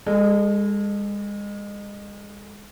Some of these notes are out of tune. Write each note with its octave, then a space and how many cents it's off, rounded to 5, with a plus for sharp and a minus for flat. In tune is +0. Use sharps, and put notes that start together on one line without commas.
G#3 -30 A4 +0